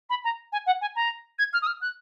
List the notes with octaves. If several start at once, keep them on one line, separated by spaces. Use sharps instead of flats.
B5
A#5
G#5
F#5
G#5
A#5
G#6
F6
D#6
F6
F#6